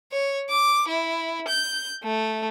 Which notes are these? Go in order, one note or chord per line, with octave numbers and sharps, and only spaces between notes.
C#5
D6
E4
G6
A3